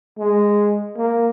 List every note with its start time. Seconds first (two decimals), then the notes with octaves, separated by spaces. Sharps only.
0.19 G#3
0.97 A#3